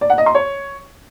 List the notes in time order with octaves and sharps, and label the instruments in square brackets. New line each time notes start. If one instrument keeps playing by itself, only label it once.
[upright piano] D5
F#5
D#5
C6
C#5